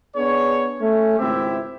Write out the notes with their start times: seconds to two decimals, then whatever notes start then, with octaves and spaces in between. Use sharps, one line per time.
0.16 B3 D4 G#4 C#5
0.81 A3 C#4
1.19 G#1 C#2 C4 E4 G4 E5